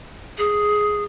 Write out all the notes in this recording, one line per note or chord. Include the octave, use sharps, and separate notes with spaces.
G#4